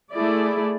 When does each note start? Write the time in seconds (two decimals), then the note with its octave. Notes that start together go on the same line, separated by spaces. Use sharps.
0.12 A3 E4 G#4 D5